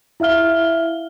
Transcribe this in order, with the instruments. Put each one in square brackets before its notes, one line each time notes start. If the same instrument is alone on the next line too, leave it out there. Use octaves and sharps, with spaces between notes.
[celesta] E4 E5 F5 F6 G7